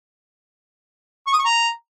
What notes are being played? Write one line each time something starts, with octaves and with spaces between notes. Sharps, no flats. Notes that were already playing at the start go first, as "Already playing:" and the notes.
C#6
D#6
C#6
A#5